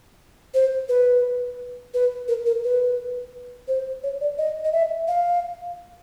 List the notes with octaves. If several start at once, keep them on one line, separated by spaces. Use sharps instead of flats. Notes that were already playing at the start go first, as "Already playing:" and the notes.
C5
B4
B4
A#4
A#4
B4
C5
C#5
D5
D#5
D#5
E5
F5